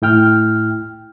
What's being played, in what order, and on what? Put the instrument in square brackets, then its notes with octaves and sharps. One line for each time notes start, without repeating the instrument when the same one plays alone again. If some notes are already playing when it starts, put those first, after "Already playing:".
[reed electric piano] A2 E4 G5 F6